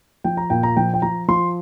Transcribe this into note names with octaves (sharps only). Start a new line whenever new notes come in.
F3 G5
A#5
A#2 G5
A#5
F3 G5
G5
F3 A#5
F3 C6